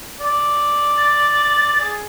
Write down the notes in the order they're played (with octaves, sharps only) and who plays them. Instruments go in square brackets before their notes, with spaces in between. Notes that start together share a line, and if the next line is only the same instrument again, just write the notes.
[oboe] D5
[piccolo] A6
[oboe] G#4